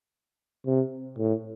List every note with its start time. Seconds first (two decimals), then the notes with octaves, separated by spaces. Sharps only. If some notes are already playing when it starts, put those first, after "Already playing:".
0.66 C3
1.18 A2